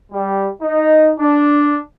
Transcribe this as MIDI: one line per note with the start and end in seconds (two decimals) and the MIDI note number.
0.12 0.49 55
0.62 1.13 63
1.20 1.80 62